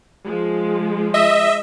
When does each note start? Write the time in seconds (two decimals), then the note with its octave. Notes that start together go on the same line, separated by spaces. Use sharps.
0.24 F3 G#3
1.14 D#5 E5